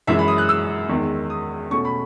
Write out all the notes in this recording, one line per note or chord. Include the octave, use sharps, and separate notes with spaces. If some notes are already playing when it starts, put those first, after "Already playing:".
F#2 E3 G#3 E5
B5
D#6
F#6
E6
E2 D#3 G#3
D#6
B2 A3 C#4 C#6
B5